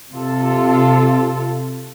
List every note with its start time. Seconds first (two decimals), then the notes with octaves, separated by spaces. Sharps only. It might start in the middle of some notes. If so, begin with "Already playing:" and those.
0.13 C3 F4 A4